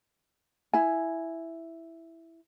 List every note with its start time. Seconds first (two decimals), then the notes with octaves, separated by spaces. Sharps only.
0.73 E4 G#5